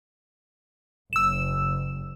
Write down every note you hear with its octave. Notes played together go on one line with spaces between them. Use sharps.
F#1 E6 E7